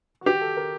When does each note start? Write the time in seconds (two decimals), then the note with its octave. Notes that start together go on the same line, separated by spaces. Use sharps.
0.21 F#4
0.26 G4
0.41 A4
0.57 A#4